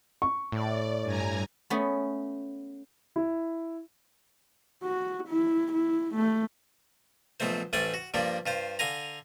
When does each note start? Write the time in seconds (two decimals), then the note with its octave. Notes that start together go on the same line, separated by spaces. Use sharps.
0.22 C#6
0.52 A2 D5
1.03 G2 G#5 A#5
1.70 A3 B3 C#4 G#4
3.16 E4
4.83 F#4
5.28 E4
5.73 E4
6.15 A3
7.40 A#1 B2 F#3 A3 C5
7.73 A1 G3 A3 C5 D5 G#5
7.94 F#4
8.14 G2 F3 G3 A#3 D4
8.46 G2 F4 C5
8.79 D3 F5 G#5 A#5